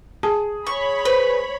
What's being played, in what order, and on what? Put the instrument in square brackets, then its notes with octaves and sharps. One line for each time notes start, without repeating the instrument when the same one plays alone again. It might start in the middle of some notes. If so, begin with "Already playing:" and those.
[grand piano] G#4 [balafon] A5
[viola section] C#5 B5 [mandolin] C#6
[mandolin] B4 [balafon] C5